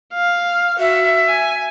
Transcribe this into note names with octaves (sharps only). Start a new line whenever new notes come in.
F5
F#4 E5
G#5